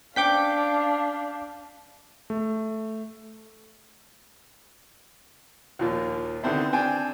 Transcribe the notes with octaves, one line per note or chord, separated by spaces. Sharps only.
C#4 D4 C5 F5 G5 D6 G6 B6
A3
D#2 A#2 F3 A#3
D3 D#3 B3 C4 D4 E4
C4 D4 G5 G#5